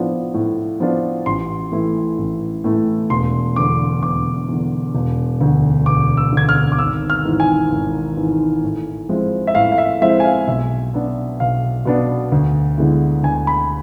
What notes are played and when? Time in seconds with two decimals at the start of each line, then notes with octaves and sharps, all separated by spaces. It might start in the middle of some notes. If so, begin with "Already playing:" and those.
Already playing: A2 F3 B3 D4 F4
0.34 A2
0.80 F3 B3 D4 F4
1.26 A1 C6
1.72 A2 E3 A3 E4
2.18 A1
2.64 A2 E3 A3 E4
3.10 E1 C6
3.56 E2 D3 D6
4.02 E1 D6
4.49 E2 D3
4.95 E1
5.41 D2 D3
5.86 E1 D6
6.17 E6
6.32 D2 D3 G#6
6.49 F6
6.72 D6
6.79 G#1 E6
7.10 F6
7.25 G#2 E3
7.40 G#5
7.72 G#1
8.17 G#2 E3
8.63 A2
9.09 F3 G#3 C4 E4
9.47 E5
9.55 A2 F5
9.72 F5
9.78 E5
10.01 F3 G#3 C4 E4 E5
10.20 G#5
10.25 F5
10.47 B1 E5
10.93 B2 B3 D4
11.40 B1 F5
11.85 B2 B3 D4
12.32 D2
12.78 D3 G#3 B3 E4
13.23 D2 G#5
13.47 B5